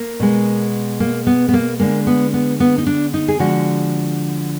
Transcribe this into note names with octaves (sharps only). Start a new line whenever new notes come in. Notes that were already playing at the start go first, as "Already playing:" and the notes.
Already playing: A#3
B2 G#3
A#3
B3
B3
A#3
D3 G#3 A#3
B3
B3
B3
D#4
D4
D#4
G#4
D3 F3 G#3 F#4